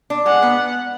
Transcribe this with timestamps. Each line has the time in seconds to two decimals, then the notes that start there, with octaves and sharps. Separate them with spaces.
0.10 D4
0.26 G#3 F#5
0.42 B3